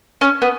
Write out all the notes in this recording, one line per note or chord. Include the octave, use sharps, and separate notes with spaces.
C#4
B3